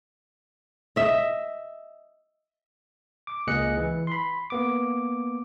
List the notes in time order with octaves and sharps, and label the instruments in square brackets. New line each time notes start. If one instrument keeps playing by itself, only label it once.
[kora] D#5 E5
[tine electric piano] D6
C#2 A#3 G#4 D#5 F#6 C#7
E3
B5 C6
A#3 B3 D6